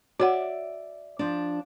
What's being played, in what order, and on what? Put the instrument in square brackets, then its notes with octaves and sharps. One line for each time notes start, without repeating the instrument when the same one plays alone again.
[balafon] F#4 C#5 F#5 [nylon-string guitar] D5 E5
[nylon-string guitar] F3 D4